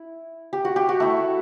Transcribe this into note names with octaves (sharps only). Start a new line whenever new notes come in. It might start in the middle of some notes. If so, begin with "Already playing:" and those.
Already playing: E4
G4
F#4
G4
F#4
A3 E4